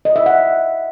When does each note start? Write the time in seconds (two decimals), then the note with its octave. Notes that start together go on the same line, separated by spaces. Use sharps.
0.05 D#5
0.16 E5
0.26 F#5